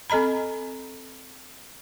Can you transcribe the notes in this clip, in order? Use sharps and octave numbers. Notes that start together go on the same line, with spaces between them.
C4 A4 D#5 A#5 B5